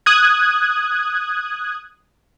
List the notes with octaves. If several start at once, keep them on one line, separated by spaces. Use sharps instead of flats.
D#6 F#6 G#6